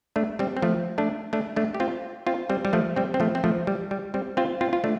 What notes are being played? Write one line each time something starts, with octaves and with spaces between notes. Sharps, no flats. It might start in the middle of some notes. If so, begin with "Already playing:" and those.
A3 D4
G3 C4
C4
F3 A3
A3 D4
A3 D4
A3 D4
G4
C4 F4
C4 F4
G3 C4
G3
F3 A3
G3 C4
C4
F3 A3
C4
F3 A3
G3
G3
G3 C4
C4 F4
C4 F4
F4
A3 D4